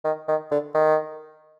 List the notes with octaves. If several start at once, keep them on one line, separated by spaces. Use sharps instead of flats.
D#3
D#3
D3
D#3